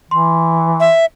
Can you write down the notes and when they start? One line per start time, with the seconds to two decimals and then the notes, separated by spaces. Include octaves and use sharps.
0.11 E3 C6
0.80 E5